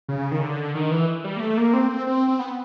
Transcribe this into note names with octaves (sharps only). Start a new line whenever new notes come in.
C#3
D#3
D3
D#3
E3
G3
A#3
A3
A#3
C4
C4
C4
C4
B3